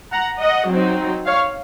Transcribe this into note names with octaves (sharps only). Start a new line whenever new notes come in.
F#5 A#5
D#5 F#5
F#3 C4 D#4
C#5 F5